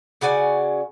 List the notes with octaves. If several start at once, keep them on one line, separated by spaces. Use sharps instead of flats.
C#3 F#4 D5 G#5